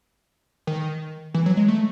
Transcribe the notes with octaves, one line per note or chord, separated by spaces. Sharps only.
D#3
E3
F#3
G#3
A3